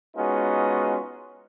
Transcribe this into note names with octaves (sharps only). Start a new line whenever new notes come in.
G#3 B3 C#4 D#4 F4 F#4